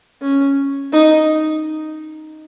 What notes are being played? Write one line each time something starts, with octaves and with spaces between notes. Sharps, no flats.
C#4
D#4